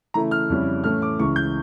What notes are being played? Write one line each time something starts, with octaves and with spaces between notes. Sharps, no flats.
C#3 E3 A3 E4 A#5
F6
F2 C#3 G3 C#4 E4
A2 E3 A3 C#4 F6
D6
C#2 C#3 E3 C#6
G6